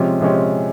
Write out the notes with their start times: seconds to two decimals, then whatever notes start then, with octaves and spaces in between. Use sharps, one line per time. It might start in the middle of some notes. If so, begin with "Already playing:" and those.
Already playing: C3 F3 G#3 C#4 G4
0.21 C3 F3 G#3 C#4 G4